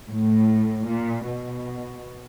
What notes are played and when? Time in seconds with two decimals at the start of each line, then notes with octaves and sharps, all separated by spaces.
0.10 A2
0.88 A#2
1.28 B2